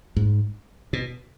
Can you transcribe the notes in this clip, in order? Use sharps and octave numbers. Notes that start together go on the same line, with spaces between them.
G#2
B2